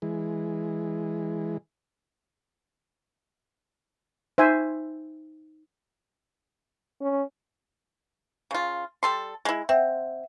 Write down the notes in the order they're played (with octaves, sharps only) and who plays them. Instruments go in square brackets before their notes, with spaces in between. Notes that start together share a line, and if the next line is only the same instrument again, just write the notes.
[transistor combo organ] E3 G#3
[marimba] D#4 [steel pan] C5 E5 G#5
[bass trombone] C#4
[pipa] C#3 F4
G3 A4 C6
G#3 E4
[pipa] C4 [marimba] E5 F#5